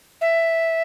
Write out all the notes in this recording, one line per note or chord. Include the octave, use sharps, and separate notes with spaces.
E5